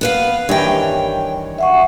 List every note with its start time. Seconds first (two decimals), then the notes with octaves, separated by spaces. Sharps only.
0.01 B3 B4 F5
0.49 G2 D#3 E3 C#5 G5
1.58 E5 F#5 C#6